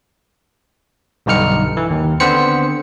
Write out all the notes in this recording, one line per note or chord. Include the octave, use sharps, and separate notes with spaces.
B1 G2 D3 D#4 F6 C#7
E3
D#2
D3 B3 C4 C5 C#7